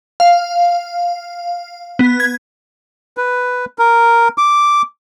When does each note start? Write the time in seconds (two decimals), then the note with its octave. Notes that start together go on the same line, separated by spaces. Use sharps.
0.20 F5
1.99 B3
2.20 G#6
3.17 B4
3.79 A#4
4.38 D6